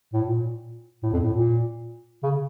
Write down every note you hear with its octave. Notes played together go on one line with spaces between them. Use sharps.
A2
A#2
A2
F2
A2
A#2
C#3